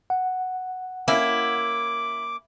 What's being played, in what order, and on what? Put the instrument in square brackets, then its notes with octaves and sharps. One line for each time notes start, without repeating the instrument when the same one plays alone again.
[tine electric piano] F#5
[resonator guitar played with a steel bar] A#3 C#4 [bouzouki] E4 [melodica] D6